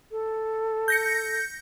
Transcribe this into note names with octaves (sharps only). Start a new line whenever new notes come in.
A4
G6 A#6 C#7